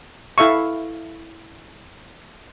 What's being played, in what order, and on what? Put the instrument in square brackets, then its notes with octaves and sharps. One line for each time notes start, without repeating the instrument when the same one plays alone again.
[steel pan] E4 A4 E5 F5 C#6